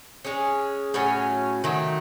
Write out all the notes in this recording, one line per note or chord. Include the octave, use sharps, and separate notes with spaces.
G#3 C#4 G#4
A2 F#3 C#4
D#3 F#3 A3